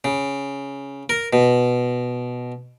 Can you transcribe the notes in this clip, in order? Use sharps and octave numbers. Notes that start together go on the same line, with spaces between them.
C#3
A#4
B2